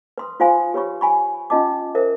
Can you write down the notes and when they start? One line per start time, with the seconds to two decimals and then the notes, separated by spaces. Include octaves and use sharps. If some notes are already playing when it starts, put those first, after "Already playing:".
0.18 B4 C6 D#6
0.40 F4 C5 F5 G#5 C6
0.74 G4 B4 C#5 B5 C#6
1.01 G#5 B5 C#6
1.50 C#4 F4 D#5 A5 D6
1.95 A#4 C5 E5